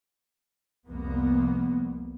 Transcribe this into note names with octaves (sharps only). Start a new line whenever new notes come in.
C2 F2 A#3 B3